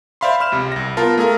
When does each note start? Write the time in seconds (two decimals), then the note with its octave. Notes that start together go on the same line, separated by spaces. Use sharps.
0.21 C5 D5 E5 F5 B5 C6
0.40 B5 F6 E7
0.52 C#2 C3
0.72 C2 A#6
0.97 B3 F4 A#4 A5
1.18 A3 G#4 A#4 F5